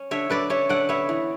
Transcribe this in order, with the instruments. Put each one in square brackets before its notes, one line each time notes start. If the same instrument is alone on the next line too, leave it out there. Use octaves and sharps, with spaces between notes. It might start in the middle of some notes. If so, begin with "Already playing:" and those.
Already playing: [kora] C#4
D3 C#5 E5
D3 B4 D5
C#4 C#5 E5
D3 D5 F#5
B3 C#5 E5
E3